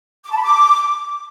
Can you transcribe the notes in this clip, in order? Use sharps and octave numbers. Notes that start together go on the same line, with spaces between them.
D6
A5
B5
D6